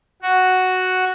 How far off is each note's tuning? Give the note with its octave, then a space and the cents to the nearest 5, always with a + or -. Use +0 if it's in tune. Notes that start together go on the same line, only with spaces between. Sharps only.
F#4 +0